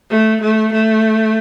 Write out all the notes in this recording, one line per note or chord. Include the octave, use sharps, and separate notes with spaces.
A3
A3
A3